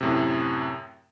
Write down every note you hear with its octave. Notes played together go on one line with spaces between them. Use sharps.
F#2 A2 C3